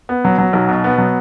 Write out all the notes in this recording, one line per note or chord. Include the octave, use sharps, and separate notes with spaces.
B3
F#3
F#3
B1
B2
B3
F#3